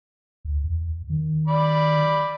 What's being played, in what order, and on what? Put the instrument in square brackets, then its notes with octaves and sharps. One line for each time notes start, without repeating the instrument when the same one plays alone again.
[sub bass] D2
E2
D#3
[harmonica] D5 B5